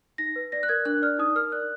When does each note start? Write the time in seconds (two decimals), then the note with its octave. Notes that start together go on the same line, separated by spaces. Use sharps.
0.18 D#4 A#6
0.36 B4
0.52 D5 A#6
0.63 F#6
0.69 A#4 G#6
0.85 D4 F#6
1.02 D5 F6
1.19 D#4 D#6
1.35 A#4 F6
1.52 D5 F#6